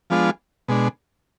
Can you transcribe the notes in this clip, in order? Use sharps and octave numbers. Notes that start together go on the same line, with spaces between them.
F3 G#3 B3 D4 F4
B2 G#3 D4